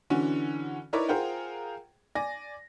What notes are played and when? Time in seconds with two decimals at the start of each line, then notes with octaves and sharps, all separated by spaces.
0.10 D3 E3 C#4 F#4
0.93 D#4 E4 A#4 B4 C#5 D5
1.09 F4 G#4 A#4 C5 F#5 G5
2.15 D5 G#5 A#6